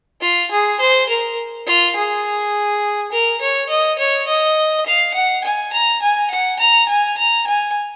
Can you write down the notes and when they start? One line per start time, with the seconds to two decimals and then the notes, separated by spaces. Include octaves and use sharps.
0.21 F4
0.51 G#4
0.80 C5
1.09 A#4
1.66 F4
1.96 G#4
3.12 A#4
3.41 C#5
3.69 D#5
3.99 C#5
4.27 D#5
4.86 F5
5.14 F#5
5.44 G#5
5.73 A#5
6.02 G#5
6.31 F#5
6.59 A#5
6.89 G#5
7.18 A#5
7.47 G#5